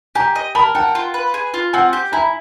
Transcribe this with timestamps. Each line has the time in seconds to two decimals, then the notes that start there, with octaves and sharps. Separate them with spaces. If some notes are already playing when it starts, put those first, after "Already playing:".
0.15 G4 G#5 A#5
0.35 D#5
0.55 A#4 A5 B5
0.75 F#5 G5 A5
0.95 F4
1.14 B4
1.34 G#4
1.54 F4
1.73 C4 F#5 G#5
1.93 G4
2.12 E4 G#5 A#5